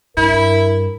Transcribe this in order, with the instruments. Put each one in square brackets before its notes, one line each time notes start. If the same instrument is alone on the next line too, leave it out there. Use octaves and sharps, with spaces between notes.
[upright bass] G2 [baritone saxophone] E4 [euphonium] A#4